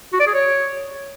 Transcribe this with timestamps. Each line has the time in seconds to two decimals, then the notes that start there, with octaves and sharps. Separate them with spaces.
0.13 F#4
0.20 D5
0.27 G#4
0.34 C#5